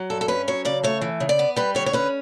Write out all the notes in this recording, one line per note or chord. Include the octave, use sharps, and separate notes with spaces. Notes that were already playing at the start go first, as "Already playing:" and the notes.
Already playing: F#3
G2 A4
A4
C#4 B4
F#3 C#5
C#3 D5
A3 C#5
E3
C#3
D5
B3
G3 B4
D3 C#5
C#5
C#4 B4